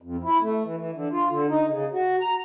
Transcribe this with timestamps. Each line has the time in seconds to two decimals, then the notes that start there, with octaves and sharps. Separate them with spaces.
0.02 F2
0.24 E4
0.42 A3
0.63 E3
0.77 E3
0.93 D3
1.12 F4
1.30 D3
1.49 D#4
1.68 C#3
1.93 F#4
2.20 A#5